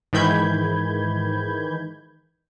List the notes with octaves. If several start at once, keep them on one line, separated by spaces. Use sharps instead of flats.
G#2 D#3 E3 B5 G6 G#6